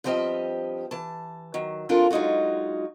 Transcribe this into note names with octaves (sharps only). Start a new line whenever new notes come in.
G2 F3 C4 G4 D#5 E5
E3 A5
D#3 F#3
F3 C4 D4 F4 A4 A#4
F#3 G#3 D#4 F4 F#4